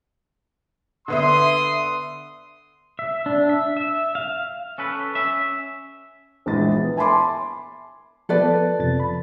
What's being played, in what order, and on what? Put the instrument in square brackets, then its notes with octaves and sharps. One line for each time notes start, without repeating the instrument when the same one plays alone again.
[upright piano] D3 B3 E5 [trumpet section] C6 D#6
[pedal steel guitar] E5
D4
E5
E5
F5
[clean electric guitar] C#4 A4 B4
C#4 E5
[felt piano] A#1 E3 G#3 A6
B3
E5 G#5 A5 B5 C6 D6
[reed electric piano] F3 B3 [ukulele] A4 B4 D5
[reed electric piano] F2 C3 A6
B5